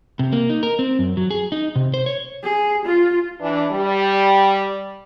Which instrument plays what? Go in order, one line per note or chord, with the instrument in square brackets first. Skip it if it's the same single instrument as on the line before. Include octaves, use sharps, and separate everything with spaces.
[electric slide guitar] C3
A#3
D#4
A#4
C4
F#2
F#3
G#4
D#4
C3
C5
C#5
[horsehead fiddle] G#4
F4
[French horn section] E3 D4
G3